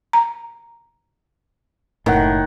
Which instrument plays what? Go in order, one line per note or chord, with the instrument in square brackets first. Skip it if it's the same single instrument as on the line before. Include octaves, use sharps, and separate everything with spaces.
[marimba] A#5
[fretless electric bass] F#1 A2 [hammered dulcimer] D#3 F#5